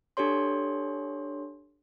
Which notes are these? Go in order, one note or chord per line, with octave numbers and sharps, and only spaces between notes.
D4 G4 A4 C#5 C6